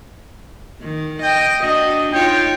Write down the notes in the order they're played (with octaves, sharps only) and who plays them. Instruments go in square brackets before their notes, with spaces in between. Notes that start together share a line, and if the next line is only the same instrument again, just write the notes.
[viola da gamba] D#3
[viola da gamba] D#5 [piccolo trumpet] G5
[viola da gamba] D4 F#4 [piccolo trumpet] D#5
[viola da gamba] D#4 F4 C#5 [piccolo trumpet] G5